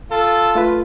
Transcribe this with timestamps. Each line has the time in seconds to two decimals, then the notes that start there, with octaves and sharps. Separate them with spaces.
0.11 F4 A4
0.55 A3 F4 B4